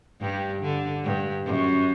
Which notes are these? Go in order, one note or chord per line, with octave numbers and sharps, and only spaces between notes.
G2 G3
D3
G2
F#2